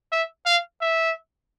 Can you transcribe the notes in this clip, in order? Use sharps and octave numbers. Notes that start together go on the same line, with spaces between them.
E5
F5
E5